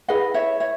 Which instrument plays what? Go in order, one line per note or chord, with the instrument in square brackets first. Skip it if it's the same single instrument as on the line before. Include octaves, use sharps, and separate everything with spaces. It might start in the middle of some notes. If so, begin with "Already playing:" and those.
[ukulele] E4 G#4 B4 D#5 F#5
C#5 E5
C#5 E5